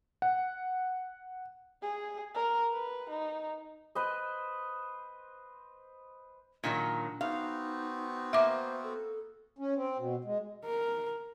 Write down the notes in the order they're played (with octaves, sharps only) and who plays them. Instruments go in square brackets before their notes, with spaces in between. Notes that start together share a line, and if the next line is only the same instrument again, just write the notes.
[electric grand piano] F#5
[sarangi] G#4
A#4
B4
D#4
[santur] B4 C5 D#5
[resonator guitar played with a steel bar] A#2 D#3 F#3 [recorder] D4
[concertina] B3 C4 F#4 [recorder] D#4 [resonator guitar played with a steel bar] F5
[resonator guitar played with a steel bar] A#3 [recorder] C5 [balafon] E5 D6
[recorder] A4
[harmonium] C#4
C4
B2
G#3
[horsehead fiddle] A#4